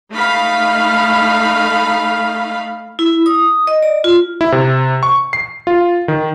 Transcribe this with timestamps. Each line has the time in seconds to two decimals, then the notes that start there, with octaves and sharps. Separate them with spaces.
0.12 A3 D#4 F5 B5
2.99 E4
3.26 D#6
3.67 D#5
3.82 D5
4.04 F4
4.41 E4
4.52 C3
5.03 C#6
5.33 C7
5.67 F4
6.08 D#3